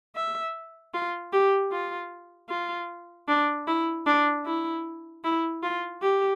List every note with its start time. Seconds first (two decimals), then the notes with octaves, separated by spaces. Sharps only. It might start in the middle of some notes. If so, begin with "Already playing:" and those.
0.16 E5
0.94 F4
1.33 G4
1.72 F4
2.50 F4
3.28 D4
3.67 E4
4.06 D4
4.46 E4
5.24 E4
5.63 F4
6.02 G4